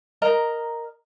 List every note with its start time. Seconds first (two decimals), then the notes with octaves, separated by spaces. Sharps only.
0.22 A#4 D#5 A#5